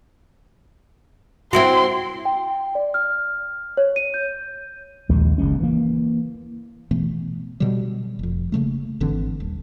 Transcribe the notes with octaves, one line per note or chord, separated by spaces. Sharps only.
C4 E4 F#4 C6
G5
D5
F6
C#5
D#7
G6
A#1 D#2 G#3
F#1 C#2 G#3 C#4
E3 A#3
B2 E3 A3 B3
B2 D3 F#3 G3
F1 F2
C#3 F#3 A3 A#3
G#1 D3 E3 C4
D#1